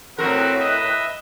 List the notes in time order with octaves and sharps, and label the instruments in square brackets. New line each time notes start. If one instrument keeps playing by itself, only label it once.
[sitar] A2 A#4 [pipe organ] C4 F#4 [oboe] B4
[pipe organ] D#5 E5